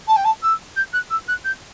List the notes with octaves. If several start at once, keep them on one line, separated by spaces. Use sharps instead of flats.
A5
G5
A5
E6
G6
F#6
E6
F#6
G6